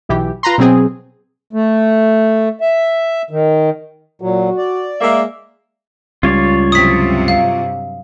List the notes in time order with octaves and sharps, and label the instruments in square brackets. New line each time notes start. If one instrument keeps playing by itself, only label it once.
[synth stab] B1 E3 G4
F4 B4 A#5 C6
B2 F#3 C4 G#4
[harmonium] A3
E5
D#3
[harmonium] A#2 F#3 [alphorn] F#4
[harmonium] D5
[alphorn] G#3 [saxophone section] A#3 E5
[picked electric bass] C#2 G3 C#4 [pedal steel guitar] F4 C#5 D5
[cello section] G2 C3 F#3 [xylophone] D#6 B6
[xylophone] F5